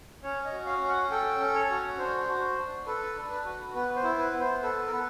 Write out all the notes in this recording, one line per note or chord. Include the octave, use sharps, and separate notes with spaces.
C#4 C#5
D#5
F#4
F5
C#4
F#5
A4 G5
C#4
C#5
F#4
D4 C5
F#4
D4
A4 B4
D4
B4
F#4
B3 B4
C5
E4
B4
B3
C5
A4 B4
A#4
B3 B4